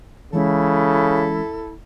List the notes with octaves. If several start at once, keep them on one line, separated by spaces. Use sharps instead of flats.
C#3 E3 G#3 C#4 E4 A4